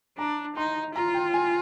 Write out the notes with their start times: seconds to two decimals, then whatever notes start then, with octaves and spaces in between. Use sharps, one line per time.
0.18 D4 A#5
0.56 D#4 C6
0.95 F4 A#5
1.14 G5
1.33 G#5